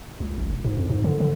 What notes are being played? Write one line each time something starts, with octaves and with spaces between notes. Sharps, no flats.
C#2
A1
E1
G#2
F2
G#2
D3
D3